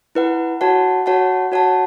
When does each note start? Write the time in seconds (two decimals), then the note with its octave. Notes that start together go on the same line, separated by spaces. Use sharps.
0.15 E4 B4 F#5
0.61 F#4 C#5 F#5 A5
1.06 F#4 C#5 F#5 A5
1.52 F#4 C#5 F#5 A5